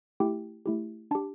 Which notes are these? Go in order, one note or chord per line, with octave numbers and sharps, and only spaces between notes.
A3 E4 G4 G5
A3 E4 G4
D4 G4 A5